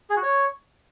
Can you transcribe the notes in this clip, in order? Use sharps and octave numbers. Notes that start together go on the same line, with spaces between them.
G#4
F#4
C#5